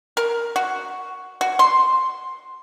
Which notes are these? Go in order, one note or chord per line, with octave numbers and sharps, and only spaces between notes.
A#4
F#4
F#4
C6